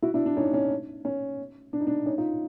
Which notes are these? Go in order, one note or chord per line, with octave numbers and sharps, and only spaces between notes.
E4 F#4
D4 E4
D4
C#4 D#4
C#4
C#4
D4
D#4
D4
C#4 D#4
D#4 F4